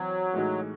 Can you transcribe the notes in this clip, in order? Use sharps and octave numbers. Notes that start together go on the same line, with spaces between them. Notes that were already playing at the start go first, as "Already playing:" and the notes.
Already playing: E3 F#3 C4
A2 E3 G#3 D#4 F#4